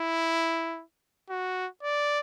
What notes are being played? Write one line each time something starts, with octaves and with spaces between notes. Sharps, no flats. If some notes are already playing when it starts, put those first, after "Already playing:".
Already playing: E4
F#4
D5